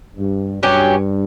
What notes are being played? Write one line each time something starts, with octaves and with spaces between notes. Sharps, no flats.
G2
G2 F#3 C#4 G4